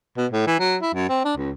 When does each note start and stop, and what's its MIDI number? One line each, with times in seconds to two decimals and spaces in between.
0.18 0.27 47
0.31 0.46 45
0.47 0.55 52
0.60 0.77 54
0.82 0.94 64
0.95 1.09 42
1.09 1.23 60
1.25 1.34 62
1.37 1.52 37